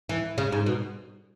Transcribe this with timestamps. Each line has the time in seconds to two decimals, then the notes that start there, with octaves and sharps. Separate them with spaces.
0.09 E3
0.38 C#3
0.52 G#2
0.66 B2